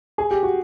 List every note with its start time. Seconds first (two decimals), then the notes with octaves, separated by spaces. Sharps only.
0.18 G#4
0.31 G4
0.43 F#4